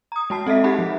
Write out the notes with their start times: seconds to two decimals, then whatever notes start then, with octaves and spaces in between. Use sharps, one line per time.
0.12 A#5 D#6
0.30 G#3 F#4 A5 C7
0.47 C4 A4 D#5 E5 B6
0.64 D#4 G4 G#4 F#5 B5
0.78 F3